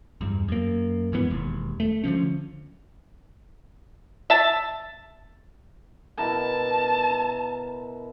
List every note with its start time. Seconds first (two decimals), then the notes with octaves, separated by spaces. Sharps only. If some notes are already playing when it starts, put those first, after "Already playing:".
0.21 E2 G2
0.48 F#2 A#3
1.12 E2 G#2 E3 B3
1.30 E1 D#2
1.80 A3
2.04 D3 D#3 F3 C#4
4.30 E5 A5
6.18 B2 E4 A#4 A5